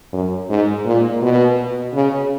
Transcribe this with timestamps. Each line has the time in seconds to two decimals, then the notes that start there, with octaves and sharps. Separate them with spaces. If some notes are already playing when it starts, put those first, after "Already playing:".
0.13 F#2
0.50 G#2
0.86 A#2
1.22 B2
1.94 C#3